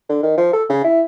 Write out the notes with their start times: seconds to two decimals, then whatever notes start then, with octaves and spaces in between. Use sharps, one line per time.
0.09 D3
0.23 D#3
0.38 F3
0.53 A4
0.70 C#3
0.84 E4